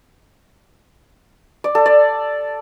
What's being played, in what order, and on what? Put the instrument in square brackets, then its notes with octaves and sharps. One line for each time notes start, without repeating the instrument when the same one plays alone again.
[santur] D5
A4
D5